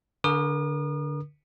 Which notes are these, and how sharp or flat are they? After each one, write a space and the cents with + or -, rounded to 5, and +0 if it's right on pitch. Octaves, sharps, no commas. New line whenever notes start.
D3 -10 A#4 +35 D#6 -40